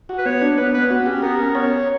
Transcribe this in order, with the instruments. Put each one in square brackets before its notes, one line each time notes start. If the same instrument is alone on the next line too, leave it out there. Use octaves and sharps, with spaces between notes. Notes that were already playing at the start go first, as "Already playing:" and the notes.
[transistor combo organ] F#4
[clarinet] B4
[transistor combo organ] B3 [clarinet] C#5
[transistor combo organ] D4
[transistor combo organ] B3 [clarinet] B4
[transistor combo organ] B3 [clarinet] B4
[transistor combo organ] F#4
[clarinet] C#4 [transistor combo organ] G4
[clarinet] B3 [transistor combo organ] A#4
[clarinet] C#4
B3
[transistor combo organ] C#5